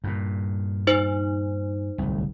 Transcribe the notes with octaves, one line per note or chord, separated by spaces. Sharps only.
G2 A#2
D#4 C5
D1 C2